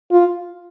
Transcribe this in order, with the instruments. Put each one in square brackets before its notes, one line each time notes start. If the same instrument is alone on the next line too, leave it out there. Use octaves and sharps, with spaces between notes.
[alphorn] F4